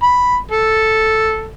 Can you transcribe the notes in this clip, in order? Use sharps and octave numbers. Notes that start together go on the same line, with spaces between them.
B5
A4